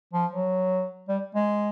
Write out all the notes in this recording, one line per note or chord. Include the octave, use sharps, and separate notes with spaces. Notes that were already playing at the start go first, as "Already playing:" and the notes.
F3
F#3
G3
G#3